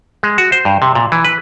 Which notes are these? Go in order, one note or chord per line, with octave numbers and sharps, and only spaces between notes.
G#3
F#4
C5
G2
C3
A#2
E3
B4